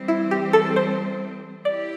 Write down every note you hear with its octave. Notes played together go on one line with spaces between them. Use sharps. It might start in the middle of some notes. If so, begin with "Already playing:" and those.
Already playing: E3 G3 C4
E4
G4
A4
C5
E4 G4 D5